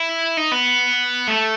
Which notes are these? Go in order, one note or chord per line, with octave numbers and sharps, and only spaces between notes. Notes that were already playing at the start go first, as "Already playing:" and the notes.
Already playing: E4
D#4
B3
A3